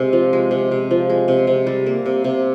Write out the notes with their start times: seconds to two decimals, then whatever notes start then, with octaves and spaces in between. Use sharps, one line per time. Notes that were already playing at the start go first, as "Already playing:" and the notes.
Already playing: C3 G#3
0.13 F3
0.33 G#3
0.51 C3
0.71 C3
0.91 F3
1.10 G#3
1.28 C3
1.47 C3
1.67 G3
1.86 A#3
2.06 C3
2.24 C3